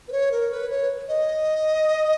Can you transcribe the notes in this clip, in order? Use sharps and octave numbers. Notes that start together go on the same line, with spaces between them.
B4
C#5
A#4
B4
C#5
D#5